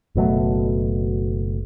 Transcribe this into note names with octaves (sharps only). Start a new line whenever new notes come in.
F#1 B2 F#3 A3